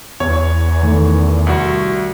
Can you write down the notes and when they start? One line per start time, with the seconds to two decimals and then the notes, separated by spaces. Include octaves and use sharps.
0.20 E2 C#5
0.83 D#3 A3
1.47 C2 F#4